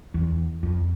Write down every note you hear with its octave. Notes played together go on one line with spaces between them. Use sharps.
E2
F2